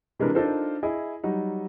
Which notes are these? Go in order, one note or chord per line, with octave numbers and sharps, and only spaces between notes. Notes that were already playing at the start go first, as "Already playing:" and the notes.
C3 E3 G#3 D4 A#4 B4
D4 D#4 F4 A4 A#4 C5
E4 G#4 D#5
F#3 G3 D#4